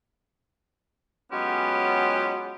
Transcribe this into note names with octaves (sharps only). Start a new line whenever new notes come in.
F#3 G#3 B3 C#4 F4 G4